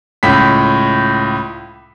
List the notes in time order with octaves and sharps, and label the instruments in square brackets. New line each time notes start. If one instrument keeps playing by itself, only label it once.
[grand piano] C#2 A2 B6